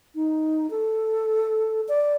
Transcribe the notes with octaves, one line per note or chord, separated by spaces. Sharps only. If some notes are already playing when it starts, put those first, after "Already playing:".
D#4
A4
D5